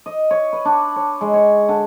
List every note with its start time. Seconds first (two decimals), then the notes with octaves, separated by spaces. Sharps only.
0.06 D#5
0.31 C#5
0.53 B4
0.65 D4
0.96 C#5
1.21 G#3
1.34 C#5
1.69 D3